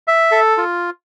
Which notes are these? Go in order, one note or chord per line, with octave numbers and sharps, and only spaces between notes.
E5
A4
F4